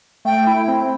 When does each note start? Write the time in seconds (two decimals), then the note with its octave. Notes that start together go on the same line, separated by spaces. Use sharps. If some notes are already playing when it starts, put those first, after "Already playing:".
0.25 A3 G5
0.47 E4
0.68 C4